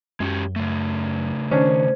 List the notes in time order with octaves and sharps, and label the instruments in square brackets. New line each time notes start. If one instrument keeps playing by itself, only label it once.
[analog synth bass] F#2 [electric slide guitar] G#3 C#4 G4
[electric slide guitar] C#3 A3
[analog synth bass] D#3 [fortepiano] C#4 D4 [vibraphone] C5